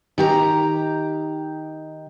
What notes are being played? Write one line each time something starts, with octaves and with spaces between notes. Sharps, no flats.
D#3 G4 A#5